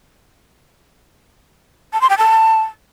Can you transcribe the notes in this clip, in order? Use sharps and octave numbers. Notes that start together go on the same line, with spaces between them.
A5
C6
G5
A5